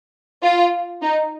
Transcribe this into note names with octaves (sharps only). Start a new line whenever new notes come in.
F4
D#4